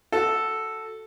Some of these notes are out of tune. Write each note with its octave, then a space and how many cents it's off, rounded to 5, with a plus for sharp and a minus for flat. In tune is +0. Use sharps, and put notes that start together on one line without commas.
F#4 +0 A4 +0